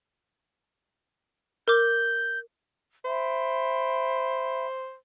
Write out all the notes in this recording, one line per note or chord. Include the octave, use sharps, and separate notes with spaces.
A#4 D6 G6
C5 E5 G5 B5